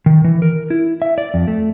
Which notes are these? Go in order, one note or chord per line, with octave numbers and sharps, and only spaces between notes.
D#3
E3
A#4
E4
E5
D5
F2
A3